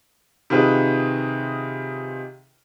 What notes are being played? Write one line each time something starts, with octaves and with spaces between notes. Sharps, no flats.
C3 D#3 F4 G#4 B4